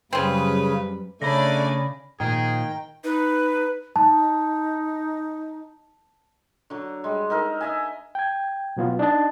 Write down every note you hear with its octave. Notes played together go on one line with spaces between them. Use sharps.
F#2 C#3 G3 C4 C#4 B4
C#3 A3 D4 C#5 D5 G#5 B5 A#6
A#2 D#3 F3 G#4 G5
D#4 B4
D#4 A5
D3 F#3
G3 G#3
D#4 A4 A#4
D#5 E5 G#5
G5 G#6
B2 F#3 B3 F4
D4 D#4 D#5 A5